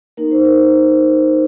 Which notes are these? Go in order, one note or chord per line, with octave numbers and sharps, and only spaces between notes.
A#3 D#4 A#4
C5
A#4